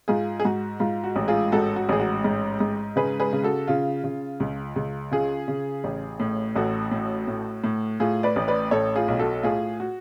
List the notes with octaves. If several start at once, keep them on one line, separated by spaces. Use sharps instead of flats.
G#2 F4 G#4
G#4
G#2 F#4
G#2 F4
F#4
A1
F4 G#4
G#2 F#4 A4
F#4
A1 G#4
F#4
G#2
G#2
C#3 G#4 B4
G#4 B4
C#3
F#4 A4
C#3 F4
C#3
C#2
C#2
C#3 F4 G#4
C#3
A1
A2
A1 F#4 A4
A2
A2
A2
A2 F4 G#4
B4 D5
A1
B4 D5
A2 A4 C#5
F4 G#4
B1
F#4 A4
A2 F4 G#4
F#4